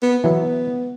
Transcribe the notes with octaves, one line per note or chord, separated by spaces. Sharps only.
B3
E3 F#3 B3 E4